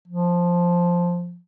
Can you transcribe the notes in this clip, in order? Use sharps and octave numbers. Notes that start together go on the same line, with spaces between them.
F3